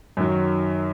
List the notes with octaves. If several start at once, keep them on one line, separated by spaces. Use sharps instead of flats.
F#2 D#3 F#3